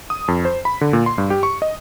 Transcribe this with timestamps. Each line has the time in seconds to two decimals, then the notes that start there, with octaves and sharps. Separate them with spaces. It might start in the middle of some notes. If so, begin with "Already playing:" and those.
0.10 D#6
0.28 F2
0.45 C5
0.65 B5
0.81 D3
0.93 A#2
1.06 C6
1.18 G2
1.30 G4
1.43 C#6
1.62 D#5